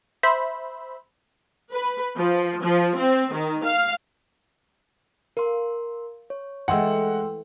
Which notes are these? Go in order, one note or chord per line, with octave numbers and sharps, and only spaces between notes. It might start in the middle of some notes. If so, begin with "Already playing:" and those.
C5 E5 B5
B4
F3
F3
C4
D#3
F5
A#4 F5 C6
C#5
E3 G#3 A3 F#5 G5 C6 E6